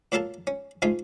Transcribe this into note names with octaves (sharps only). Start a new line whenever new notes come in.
A#2 F#3 A#3 A4 A#4 A5
C#4
G#2 G#3 A3 D#4 F4